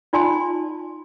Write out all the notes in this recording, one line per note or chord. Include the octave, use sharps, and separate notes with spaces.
D#4 F4 D5 G#5 A5 C6